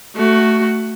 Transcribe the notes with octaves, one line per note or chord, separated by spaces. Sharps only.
A3 F#4